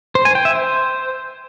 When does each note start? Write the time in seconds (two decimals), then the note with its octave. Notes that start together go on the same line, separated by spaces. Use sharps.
0.15 C5
0.25 G#5
0.35 G5
0.45 E5
0.55 C5